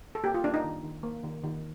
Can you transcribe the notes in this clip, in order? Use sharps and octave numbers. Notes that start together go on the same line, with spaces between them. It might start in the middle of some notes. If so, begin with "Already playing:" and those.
A4
A#3 G4
F4
A#3 D4
D#4
D#3
D#3
A#3
D#3
D#3